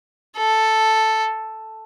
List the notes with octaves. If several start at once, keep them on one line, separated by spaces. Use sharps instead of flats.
A4